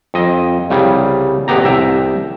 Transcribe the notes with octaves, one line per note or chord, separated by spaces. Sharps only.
F2 D#5
C2 C#3 G3
A1 E2 B3 G4 A#5
C2 E5 G5 A#5